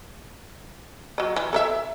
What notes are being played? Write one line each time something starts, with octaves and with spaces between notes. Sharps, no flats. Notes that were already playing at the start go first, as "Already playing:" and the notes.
F#3 D#5
E3
A4 A#4 E5